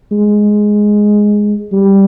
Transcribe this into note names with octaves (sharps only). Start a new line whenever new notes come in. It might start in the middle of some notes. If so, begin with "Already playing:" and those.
G#3
G3